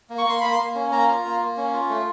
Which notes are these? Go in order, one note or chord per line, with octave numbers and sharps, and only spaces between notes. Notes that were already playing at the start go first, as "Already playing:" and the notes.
A#3
C#6
A#3 C6
A#3 B5
C6
A#3
C#4
A#3 A#5
F4
A#3
A#3
C#4
F4
A3